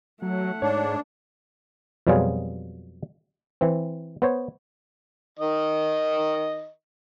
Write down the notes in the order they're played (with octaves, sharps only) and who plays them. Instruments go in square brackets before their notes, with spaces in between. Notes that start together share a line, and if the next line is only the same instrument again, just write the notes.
[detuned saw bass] F#3 [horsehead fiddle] A3 F#5
[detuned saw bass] G#2 [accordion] D4 [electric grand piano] C#5
[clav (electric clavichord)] F2 B2 F#3 G3 F4 G#4
E3 C4
B3 C5 C#5
[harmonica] D#3 D#5